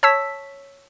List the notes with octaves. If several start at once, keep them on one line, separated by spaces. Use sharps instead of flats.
C#5 A5 E6 B6